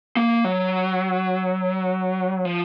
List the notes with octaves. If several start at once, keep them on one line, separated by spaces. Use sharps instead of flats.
A#3
F#3
F3